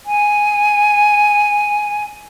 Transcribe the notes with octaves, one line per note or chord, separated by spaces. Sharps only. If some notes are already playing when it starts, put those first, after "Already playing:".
G#5